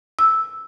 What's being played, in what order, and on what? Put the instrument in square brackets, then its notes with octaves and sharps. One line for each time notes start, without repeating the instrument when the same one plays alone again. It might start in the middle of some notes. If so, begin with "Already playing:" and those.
[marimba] E6